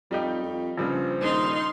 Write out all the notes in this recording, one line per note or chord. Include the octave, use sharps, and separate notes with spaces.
F2 G3 D#4 G4
F2
A#1 G2 C#3 F3 C5
D#1 D#4 C6